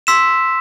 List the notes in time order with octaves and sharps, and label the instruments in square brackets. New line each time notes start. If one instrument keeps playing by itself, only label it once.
[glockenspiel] C6 E6 B6 E7